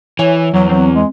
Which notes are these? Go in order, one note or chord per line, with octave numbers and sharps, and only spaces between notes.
E3 C#5 E5 G#5
E2 F#3
F#3 C4
G#3